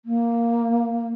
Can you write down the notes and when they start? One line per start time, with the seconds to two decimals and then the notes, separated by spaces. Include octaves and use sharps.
0.05 A#3